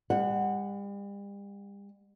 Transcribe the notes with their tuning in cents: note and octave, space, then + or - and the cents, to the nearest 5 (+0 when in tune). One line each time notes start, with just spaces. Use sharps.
G3 +40 F#5 +0